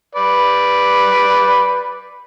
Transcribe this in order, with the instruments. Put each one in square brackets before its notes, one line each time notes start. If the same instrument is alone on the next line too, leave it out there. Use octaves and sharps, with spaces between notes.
[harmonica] B4 D5